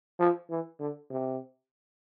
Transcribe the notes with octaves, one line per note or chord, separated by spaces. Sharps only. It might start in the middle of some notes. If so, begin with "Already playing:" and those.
F3
E3
D3
C3